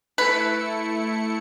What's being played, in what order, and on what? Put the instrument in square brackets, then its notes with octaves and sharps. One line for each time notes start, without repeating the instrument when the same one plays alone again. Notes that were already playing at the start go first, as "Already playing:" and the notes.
[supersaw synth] A3 E4 C#7 [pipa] B4